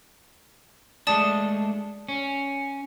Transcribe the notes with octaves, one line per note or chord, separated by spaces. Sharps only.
G#3 A3 D4 D5 A5 D#6
C#4